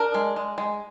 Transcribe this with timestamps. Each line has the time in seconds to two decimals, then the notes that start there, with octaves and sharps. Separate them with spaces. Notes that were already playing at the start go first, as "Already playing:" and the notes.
Already playing: D4 A#4
0.14 G#3
0.36 G#3
0.58 G#3